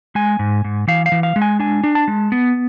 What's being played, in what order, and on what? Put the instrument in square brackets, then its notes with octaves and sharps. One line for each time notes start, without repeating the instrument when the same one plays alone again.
[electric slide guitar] G#3 G#5
G#2
G#2
E3 F5
F5
E3
F5
G#3
G#5
D4 G#5
D4
A5
G#3
B3